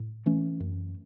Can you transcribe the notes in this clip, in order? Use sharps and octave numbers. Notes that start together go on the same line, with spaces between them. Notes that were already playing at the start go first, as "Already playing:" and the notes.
Already playing: A2
E3 A3 C#4
F#2